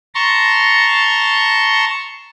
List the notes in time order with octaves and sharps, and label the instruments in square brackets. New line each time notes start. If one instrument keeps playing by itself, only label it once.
[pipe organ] A5 A#5 C6 C#6